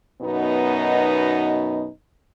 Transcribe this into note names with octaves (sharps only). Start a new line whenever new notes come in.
F#2 B2 B3 D#4